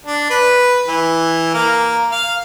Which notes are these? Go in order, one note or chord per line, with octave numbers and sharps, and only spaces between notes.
D4
B4
E3
A#3
F5